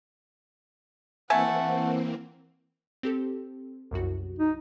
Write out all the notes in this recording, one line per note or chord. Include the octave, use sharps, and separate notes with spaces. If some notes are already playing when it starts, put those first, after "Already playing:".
E3 A3 A#3 C4 E5 F#5 G#5
C4 G4 A4
C2 F#2 F#4
D#4